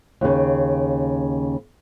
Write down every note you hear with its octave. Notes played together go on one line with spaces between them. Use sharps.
D#2 C#3